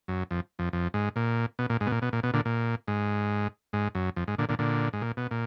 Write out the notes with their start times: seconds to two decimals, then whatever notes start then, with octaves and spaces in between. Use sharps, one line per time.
0.08 F#2
0.31 F2
0.59 F2
0.73 F2
0.94 G#2
1.16 A#2
1.59 B2
1.70 A#2
1.80 G#2
1.87 B2
1.92 A#2
2.02 B2
2.13 A#2
2.23 B2
2.33 A#2 D3
2.45 A#2
2.88 G#2
3.73 G#2
3.95 F#2
4.16 F2
4.28 G#2
4.38 A#2 D3
4.49 A#2 D3
4.59 A#2 D3
4.93 G#2
5.02 A#2
5.17 B2
5.31 A#2